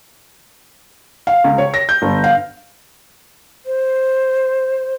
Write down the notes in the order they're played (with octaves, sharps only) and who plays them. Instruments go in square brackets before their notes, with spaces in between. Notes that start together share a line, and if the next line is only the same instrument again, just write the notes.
[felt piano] F5
C#2
C#5
A#6
G6
G1
F5
[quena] C5